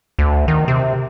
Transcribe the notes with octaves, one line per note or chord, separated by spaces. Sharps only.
D2
D#3
C3